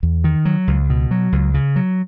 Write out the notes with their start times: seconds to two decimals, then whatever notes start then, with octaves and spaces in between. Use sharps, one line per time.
0.03 E2
0.24 D#3
0.45 F#3
0.67 C#2
0.90 B2
1.11 F#3
1.32 C#2
1.54 C#3
1.76 F#3